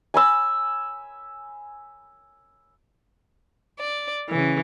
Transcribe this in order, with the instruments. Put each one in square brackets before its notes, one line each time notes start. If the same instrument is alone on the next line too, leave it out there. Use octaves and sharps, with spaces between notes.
[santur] G#5 B5 E6
[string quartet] D5
C#3 E3